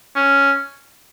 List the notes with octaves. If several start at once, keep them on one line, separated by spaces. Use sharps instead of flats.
C#4